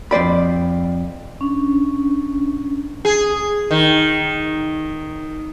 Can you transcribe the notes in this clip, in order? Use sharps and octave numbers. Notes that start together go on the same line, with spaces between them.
F2 C5 D5 B5
C#4 D4
G#4
D#3